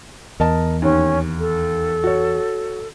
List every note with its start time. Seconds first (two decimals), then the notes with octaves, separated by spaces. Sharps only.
0.40 E2 A#4 D#5 A5
0.82 D#2 C#4
1.40 A4
2.04 F#4 C#5